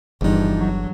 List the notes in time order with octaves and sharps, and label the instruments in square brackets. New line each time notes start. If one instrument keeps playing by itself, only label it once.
[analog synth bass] G1 [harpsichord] E2 D3 [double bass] G2 [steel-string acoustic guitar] E3 F3 D#4
[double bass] F#3